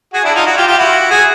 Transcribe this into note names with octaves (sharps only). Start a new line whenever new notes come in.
F#4 G#4
D4 E4
D#4 F4
E4 F#4
F4 G4
F4 G4
E4 F#4
F#4 G#4